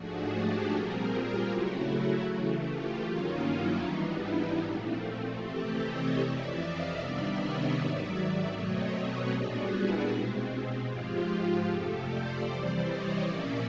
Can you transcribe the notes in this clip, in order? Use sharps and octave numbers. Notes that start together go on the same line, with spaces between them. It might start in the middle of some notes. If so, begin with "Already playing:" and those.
Already playing: G#2 F3 A3 D4 F#4 G#4
G4 A4
A#2 G3 C4 G#4 A#4
F4 G4
C#3 F#3 A3 E4 F#4
C#3 E3 A3
F4 G4
G2 D#3 F#3 A#3 C#4 D#4 F4
E4
G#2 E3 G3 B3 D4 D#4
E4
A#2 F3 A3 C4
C3 E3 A3 C4 G4 A4
C#5 D#5
F2 C3 E3 D5 E5
D#5 F5
C3 D#3 G3 B3 D4 D5 E5
C#5 D#5
G#2 D#3 F#3 D5 E5
D5 E5
B2 F#3 A3 C4 C#5 D#5
B4 C#5
A#2 G3 B3 D4 F#4 G#4
E4 F#4
B2 G#3 C4
G#2 F3 G#3 F4 G4
F4 G4
F2 C3 F3 A3 G4 A4
C5 D5
C3 E3 G3 C5 D5
C#5 D#5
A#2 F3 A#3 C#4 D5 E5